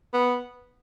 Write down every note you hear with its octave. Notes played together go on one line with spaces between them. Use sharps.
B3